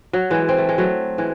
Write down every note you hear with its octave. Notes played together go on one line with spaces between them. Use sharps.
F#3
E3 G#3
C4
A3
G#3
F#3 A3
E3 G#3